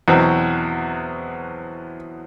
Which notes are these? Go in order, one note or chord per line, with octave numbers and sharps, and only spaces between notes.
E2 B2 F#3 C4